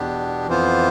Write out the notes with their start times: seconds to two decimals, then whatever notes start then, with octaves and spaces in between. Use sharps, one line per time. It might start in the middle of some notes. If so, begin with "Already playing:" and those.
Already playing: E2 B2 B3 D4 G4
0.47 F2 E3 B3 F4 C5